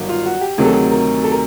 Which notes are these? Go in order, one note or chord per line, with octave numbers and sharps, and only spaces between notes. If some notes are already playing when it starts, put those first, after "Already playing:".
Already playing: G1 G2 D#3 F#3
F4
F#4
G4
D2 C3 D#3 F#3 G#4
A4
G#4
A#4
A4
A#4